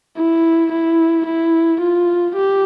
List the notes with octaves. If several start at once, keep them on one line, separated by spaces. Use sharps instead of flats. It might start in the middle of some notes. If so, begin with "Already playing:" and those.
E4
E4
E4
F4
G4